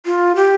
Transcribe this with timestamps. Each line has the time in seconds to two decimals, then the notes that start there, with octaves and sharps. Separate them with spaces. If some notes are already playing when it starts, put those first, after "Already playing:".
0.06 F4
0.36 G4